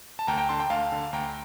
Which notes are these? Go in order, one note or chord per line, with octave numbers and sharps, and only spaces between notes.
A5
D2 G5 A#5
G5 A#5
D3 A5 C6
G5 A#5
D2 F5 A5
D3
D2 G5 A#5